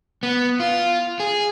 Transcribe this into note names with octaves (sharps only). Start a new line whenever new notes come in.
B3
F4
G#4